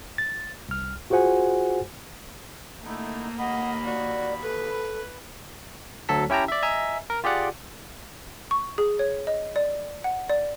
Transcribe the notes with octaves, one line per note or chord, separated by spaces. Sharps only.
A6
C2 F6
F4 F#4 G#4 C5 F#5 G#5
D3 A3 A#3 D#4 E4
D#2 D#5 F#5 B5
F#4 D5
A4 B4
D2 F#3 A4 A5 B6
C#4 E4 G4 G5 A5 A#5
D5 E5
D#5 E5 G#5 A#5
A#4
F4 G4 G#4 D5 F#5
C#6
G#4
C#5
D#5
D5
F#5
D5